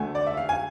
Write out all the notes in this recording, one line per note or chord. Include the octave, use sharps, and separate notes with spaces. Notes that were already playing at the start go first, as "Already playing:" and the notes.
Already playing: D2 D3 A3 G#5
D5
E5
F5
G#5